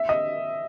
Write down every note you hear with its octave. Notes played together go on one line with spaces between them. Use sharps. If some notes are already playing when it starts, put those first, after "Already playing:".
Already playing: E5
D#5